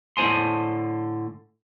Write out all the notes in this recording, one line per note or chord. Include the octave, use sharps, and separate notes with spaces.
A2 D3 D#4 C5 G#5 C6